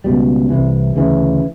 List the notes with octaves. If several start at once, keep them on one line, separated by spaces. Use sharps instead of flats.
C#2 B2 G3
C2 C3 E3
D2 C#3 E3